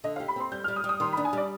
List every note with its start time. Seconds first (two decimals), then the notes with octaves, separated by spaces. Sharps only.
0.04 D3 D#5
0.16 F5
0.20 G4
0.28 B5
0.36 C4 C6
0.52 G3 G6
0.64 F6
0.68 G3
0.76 D#6
0.84 G3
0.89 D#6
1.00 D#3 C6
1.13 B5
1.17 D4
1.25 G#5
1.33 G3 D5